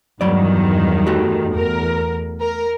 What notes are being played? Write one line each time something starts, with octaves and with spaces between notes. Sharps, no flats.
E2 G2 D#3 F#3 D5
A3 F#4 G4
E2 A#4
A#4